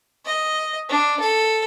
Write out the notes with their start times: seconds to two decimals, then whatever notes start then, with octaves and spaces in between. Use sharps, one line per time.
0.25 D#5
0.89 D4
1.19 A4